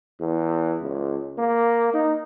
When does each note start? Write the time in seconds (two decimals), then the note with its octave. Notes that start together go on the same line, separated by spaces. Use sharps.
0.20 E2
0.82 C#2
1.38 A#3
1.94 D#4